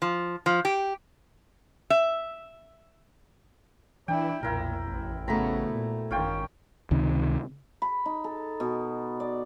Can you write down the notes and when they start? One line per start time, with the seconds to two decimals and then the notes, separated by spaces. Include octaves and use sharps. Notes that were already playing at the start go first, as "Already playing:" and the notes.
0.02 F3
0.46 F3
0.65 G4
1.90 E5
4.08 E3 D4 E4 G5
4.43 B1 F2 A#2 E4 A#4
4.87 A1
5.28 C#3 A3 B3 F#4 C5 A#5 B5
5.71 A#2
6.11 G#1 F#2 D#3 C#4 F4 G5
6.91 C#2 C3 D#3
7.82 B5
8.06 D#4
8.24 A4
8.60 B2
9.20 D5